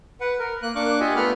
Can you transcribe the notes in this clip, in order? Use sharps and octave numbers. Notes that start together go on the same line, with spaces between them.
B4 F#5
A#4
A#3 F#6
A#3 D4 C#6 D6 F#6
F4 G4 D#5 E5 F#5 G#5
A3 B3 F4 F#5 B5 F6